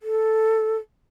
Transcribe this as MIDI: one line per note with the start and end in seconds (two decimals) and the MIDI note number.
0.03 0.77 69